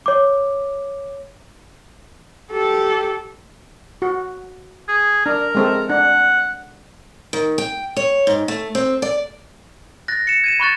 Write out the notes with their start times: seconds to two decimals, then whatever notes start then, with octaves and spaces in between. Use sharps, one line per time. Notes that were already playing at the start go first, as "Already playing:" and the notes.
0.06 C#5 D6
2.52 G4 A4
4.02 F#4
4.89 G#4
5.26 D4 A#4
5.55 G#3 C4 A4
5.90 D4 F#5
7.33 D#3
7.58 G5
7.97 C#5
8.27 G#2
8.48 A3
8.75 C4
9.02 D5
10.08 F#6 A6 A#6
10.27 C#7 E7
10.44 G#6 D#7 E7
10.60 B5 C#6 F#6 A6